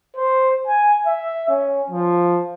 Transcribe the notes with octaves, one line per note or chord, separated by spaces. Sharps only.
C5
G#5
E5
C#4
F3